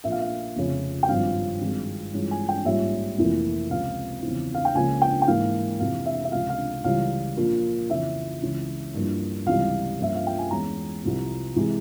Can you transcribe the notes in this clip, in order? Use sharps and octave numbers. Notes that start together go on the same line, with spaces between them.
A#1 A#2 F3 A#3 F4 E5
F5
E5
F1 F2 C#3
G5
G#1 G2 F3 F5
G#1 G2 F3 G#3
G2 E3 G#3 C#4 F4
G#5
G5
A#1 G#2 G3 C#4 F4 E5
F1 F2 E3 A#3 E4
C#2 C3 F3 C4 F5
E2 C#3 F3 C4 E4
F5
G5
C#2 C#3 F3 A#3 G#5
G5
G5
G#2 E3 A#3 F5
F2 C3 E3 F5
E5
E5
C#2 C3 F3 F5
F5
C#2 C#3 E3 G3 F5
A#1 A#2 F3 A#3 F4
F2 C#3 E3 E5
C#2 C#3 E3
G2 F3 A#3 E4
C#2 C3 E3 G3 F5
G2 F3 A#3 C#4 F4 E5
F5
G5
G#5
E2 E3 G#3 C#4 A#5
C2 C3 F3
C3 E3 G#3